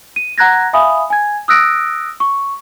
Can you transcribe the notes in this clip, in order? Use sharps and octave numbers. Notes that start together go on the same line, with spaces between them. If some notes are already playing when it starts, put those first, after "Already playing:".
D#7
F#5 A#5 F#6 G#6 A#6
E5 F5 G#5 B5 D#6
G#5 G#6
D#6 E6 F#6 A#6 D7
C#6